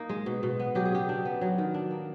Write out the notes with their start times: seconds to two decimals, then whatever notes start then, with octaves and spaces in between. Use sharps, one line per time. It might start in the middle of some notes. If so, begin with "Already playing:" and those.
Already playing: A#3 D#4
0.09 G#3
0.26 B2
0.43 B2
0.59 B3
0.75 F#3 G4
0.85 G#4
0.92 C#3 G4
1.09 D4
1.25 B3
1.41 F#3
1.58 D#3
1.74 D4
1.91 A#3